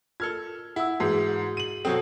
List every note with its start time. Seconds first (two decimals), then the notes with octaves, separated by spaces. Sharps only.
0.20 F4 A4 A#4 F6 G#6
0.76 E4 F#5 E6
1.00 G#2 E3 F#4 G#4
1.57 D#7 F#7
1.85 B2 F#3 C4 A4